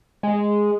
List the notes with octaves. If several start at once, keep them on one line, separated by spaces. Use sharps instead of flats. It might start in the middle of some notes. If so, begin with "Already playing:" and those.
G#3